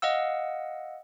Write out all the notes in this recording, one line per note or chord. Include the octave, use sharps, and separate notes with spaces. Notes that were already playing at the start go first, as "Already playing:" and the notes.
D#5 F5 F#5 E6